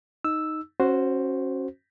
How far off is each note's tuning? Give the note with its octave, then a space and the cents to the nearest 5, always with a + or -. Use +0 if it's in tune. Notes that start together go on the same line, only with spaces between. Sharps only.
D#4 +0 E6 +0
C#4 -25 F#4 +0 C5 +0